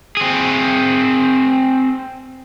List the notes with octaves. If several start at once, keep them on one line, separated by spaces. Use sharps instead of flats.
C4 G#4